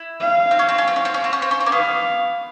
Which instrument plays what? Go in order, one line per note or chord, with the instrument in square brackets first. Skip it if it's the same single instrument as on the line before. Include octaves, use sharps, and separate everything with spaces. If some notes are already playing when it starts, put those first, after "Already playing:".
Already playing: [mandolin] E4
[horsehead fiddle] F5
[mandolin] C4
C#4
C4
C#4
C4
C#4
C4
C#4
C4
C#4
C4
C#4
C4
A#3
[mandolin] B3 [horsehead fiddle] F5